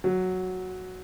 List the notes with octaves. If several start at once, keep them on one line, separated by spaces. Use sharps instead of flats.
F#3